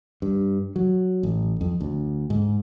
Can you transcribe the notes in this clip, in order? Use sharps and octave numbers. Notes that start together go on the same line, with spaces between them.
G2
F#3
A1
F2
D2
G#2